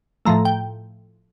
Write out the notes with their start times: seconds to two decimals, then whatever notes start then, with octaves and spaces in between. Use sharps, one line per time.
0.25 A2 F3 A3 A#5
0.45 G5